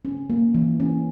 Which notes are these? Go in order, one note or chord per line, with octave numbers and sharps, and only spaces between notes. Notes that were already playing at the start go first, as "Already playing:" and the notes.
C#4
A#3
E3
C#4